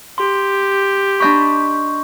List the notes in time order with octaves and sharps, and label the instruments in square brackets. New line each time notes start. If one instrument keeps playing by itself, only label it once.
[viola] G4 [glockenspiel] C6
[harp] D4 D#5 B5 [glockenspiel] C#6 G6